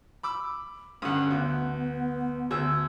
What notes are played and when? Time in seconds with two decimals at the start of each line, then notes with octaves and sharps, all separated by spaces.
0.23 B5 D6 E6
1.02 G2 D3 C#4 F#5 D#6
1.30 D2 B3
2.51 D2 G#4 E6